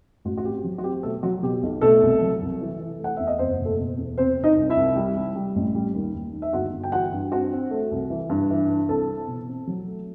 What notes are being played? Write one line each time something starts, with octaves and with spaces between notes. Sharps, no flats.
A1 F#4
F#4
C4 G4
F#3
F#4
C4 G4
B2 A3 A4
F#3 F#4
B2 G4
B1
B2 A3 A4
C2
F#3
C2
E3
E3
A3 F#5
E2 E5
D#5
F#1 C4 C5
B2
A3 A4
B2
E2
C3 C4 C5
C3
D#4 D#5
C2
E4 E5
C2
G3
G3
G3
A1
G3
D#2
D#2
D#3
E5
G1 F#4 F#5
G1
G5
E3 F#4 F#5
G2
C4 F#4 F#5
C4
A3
C2
E3
G2
E3
E3
C2 A4 A5
C4
B2
C4
F#3
A3